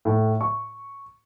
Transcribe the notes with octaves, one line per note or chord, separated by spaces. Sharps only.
A2
C#6